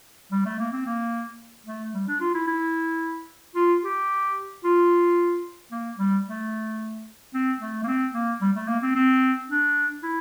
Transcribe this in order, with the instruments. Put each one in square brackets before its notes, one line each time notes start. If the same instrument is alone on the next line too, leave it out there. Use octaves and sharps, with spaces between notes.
[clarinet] G3
A3
A#3
C4
A#3
A3
G3
D4
F4
E4
E4
F4
G4
F4
A#3
G3
A3
C4
A3
A#3
C4
A#3
G3
A3
A#3
C4
C4
D4
E4